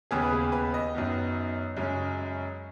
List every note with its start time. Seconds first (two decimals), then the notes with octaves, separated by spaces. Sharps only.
0.11 D#2 C#3 B3 G#4
0.22 B4
0.32 G#4
0.52 B4
0.74 D#5
0.95 F#2 D#3 B3
1.77 F#2 C#3 G#3 C#4